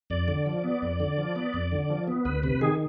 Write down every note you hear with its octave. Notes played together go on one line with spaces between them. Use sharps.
F2 D5
D3
F3
B3
F2
D3
F3
B3
F2
D3
F3
B3
D2 B4
C3 B4
D#3 G#4